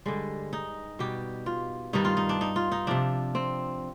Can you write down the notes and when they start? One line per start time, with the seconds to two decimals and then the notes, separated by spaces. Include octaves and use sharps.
0.06 G2 D3 G3 G#3
0.53 D#4
0.99 B2 G3 G4
1.46 F4
1.93 G2 D#3 G3 D#4
2.05 F4
2.17 D#4
2.29 D4
2.41 D#4
2.56 F4
2.72 D#4
2.87 C3 F3 D4
3.35 C4